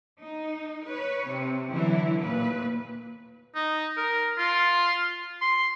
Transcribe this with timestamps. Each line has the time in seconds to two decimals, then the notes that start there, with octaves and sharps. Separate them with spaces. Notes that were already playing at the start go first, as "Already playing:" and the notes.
0.20 D#4
0.87 B4 C#5
1.26 C3
1.72 D3 E3 F#3 E4
2.21 D#2 A#2 A#3 B4
3.55 D#4
3.97 A#4
4.38 F4
5.41 C6